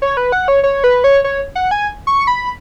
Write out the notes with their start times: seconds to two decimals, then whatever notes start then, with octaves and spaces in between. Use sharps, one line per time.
0.02 C#5
0.17 B4
0.32 F#5
0.48 C#5
0.63 C#5
0.84 B4
1.04 C#5
1.24 C#5
1.55 F#5
1.71 G#5
2.07 C#6
2.27 B5